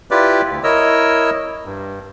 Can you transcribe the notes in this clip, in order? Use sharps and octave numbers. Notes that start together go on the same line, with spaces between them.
E4 F4 G4 B4 D5
D2
E4 A#4 C#5 D#5 E6
G2